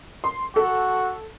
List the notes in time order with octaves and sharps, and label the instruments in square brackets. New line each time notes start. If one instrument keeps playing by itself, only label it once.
[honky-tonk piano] C6
[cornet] F#4 [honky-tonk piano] A4